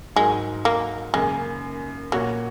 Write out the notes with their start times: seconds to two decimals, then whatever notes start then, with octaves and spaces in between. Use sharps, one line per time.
0.16 G#2 F#3 G#3 D#4 A#4
0.65 A#3
1.14 F#2 C#3 G#3 A#3
2.12 A#2 F#3 A#3 F#4 C#5